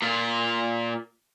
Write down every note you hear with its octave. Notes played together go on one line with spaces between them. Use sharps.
A#2 F4